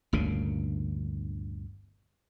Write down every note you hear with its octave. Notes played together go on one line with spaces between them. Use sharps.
G1 D2 A#2 C#3